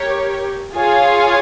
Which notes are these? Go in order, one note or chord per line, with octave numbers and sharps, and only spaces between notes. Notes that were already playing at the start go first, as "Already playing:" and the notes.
Already playing: G4 A#4 C#5
F4 G#4 C#5 F5 G#5